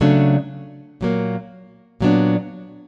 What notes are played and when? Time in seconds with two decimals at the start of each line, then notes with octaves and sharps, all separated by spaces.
0.01 C#3 F#3 A3 D4
1.01 A#2 F#3 A#3
2.00 A#2 F#3 B3 D4